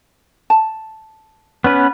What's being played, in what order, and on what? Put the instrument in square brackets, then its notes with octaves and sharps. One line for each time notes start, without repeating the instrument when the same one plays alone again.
[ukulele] A5
[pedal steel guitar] B3 C#4 B4